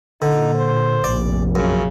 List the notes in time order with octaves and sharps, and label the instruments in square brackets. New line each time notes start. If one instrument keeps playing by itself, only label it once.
[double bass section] A#2 [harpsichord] D3 [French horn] D#4
[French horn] C5
[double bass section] F1 A#1 [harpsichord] D5
[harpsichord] F#2 [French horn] C#3